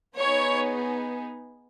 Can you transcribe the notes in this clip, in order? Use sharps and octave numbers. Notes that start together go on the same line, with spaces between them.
B3 D#4 G#4 C#5